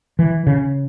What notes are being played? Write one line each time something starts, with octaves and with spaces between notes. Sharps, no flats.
E3
C#3